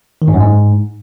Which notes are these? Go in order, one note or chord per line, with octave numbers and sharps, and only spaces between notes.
D#3
G#2
F#2
G#2